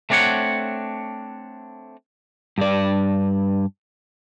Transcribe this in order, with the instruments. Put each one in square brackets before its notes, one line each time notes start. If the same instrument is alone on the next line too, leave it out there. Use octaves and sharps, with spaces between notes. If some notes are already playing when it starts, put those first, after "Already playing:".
[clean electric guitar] A3 C4 D4 F#4 C#5 F#5
[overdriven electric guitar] G2 D5